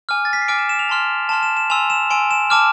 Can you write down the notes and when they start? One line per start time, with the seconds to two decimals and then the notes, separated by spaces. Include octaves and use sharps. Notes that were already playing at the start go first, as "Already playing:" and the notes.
0.09 G#5 D6 F6
0.25 A6
0.33 B6
0.42 C7
0.48 G#5 D6 F6 D7
0.58 E7
0.69 E7
0.79 F7
0.89 A5 C6 F6
1.29 A5 C6 F6 E7
1.43 E7
1.57 E7
1.70 G#5 C6 E6 F7
1.90 E7
2.10 G#5 C6 E6 D7
2.31 E7
2.50 A5 D6 F6 E7